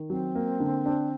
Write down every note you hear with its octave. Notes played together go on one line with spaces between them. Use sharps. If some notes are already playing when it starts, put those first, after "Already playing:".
Already playing: D#3
F#3 C4
A#3
D3
D4